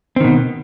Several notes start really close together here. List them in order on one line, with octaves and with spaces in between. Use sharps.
C4 D#3 B2